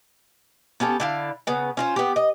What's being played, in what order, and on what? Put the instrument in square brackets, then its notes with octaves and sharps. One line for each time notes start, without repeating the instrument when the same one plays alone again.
[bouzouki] B3 C#4 G4 A4
D3 E4 F5
C#3 B3
C#4 F4 C5
B3 G4
D#5